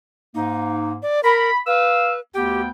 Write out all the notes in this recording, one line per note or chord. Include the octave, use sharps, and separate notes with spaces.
G#2 A#3 D#4
D5
A#4 B5
B4 F5 E6
D2 B3 G4 G5